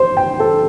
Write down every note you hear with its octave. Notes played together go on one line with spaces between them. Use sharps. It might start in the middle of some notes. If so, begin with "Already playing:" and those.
Already playing: C5
G5
A4